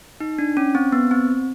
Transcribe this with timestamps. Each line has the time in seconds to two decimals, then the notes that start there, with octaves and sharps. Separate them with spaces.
0.20 D#4
0.38 D4
0.57 C#4
0.75 C4
0.92 B3
1.11 C4